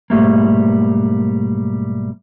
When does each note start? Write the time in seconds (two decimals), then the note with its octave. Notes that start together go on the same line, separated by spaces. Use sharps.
0.10 B1 G#2 G3 A3 A#3